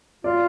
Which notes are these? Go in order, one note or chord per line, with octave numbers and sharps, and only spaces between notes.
F4 D5